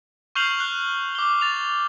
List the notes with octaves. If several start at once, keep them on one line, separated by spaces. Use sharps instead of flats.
C#6 F6 G6 C7 F7 F#7
F#6
D6 G7
A6 F7